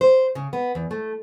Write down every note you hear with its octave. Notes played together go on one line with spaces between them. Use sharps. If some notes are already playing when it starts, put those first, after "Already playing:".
C5
C#3
B3
E2
A3